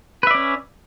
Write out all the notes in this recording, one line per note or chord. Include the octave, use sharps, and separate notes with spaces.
C#4 B4 D5 E5